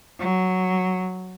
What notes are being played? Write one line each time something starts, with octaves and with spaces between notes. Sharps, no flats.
F#3